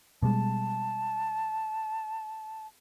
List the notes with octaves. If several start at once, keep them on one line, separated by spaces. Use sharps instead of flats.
B2 G3 G#3 A5